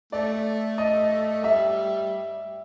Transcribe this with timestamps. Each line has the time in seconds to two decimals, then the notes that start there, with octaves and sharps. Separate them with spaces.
0.12 A3 D5
0.78 D#5
1.43 G3 E5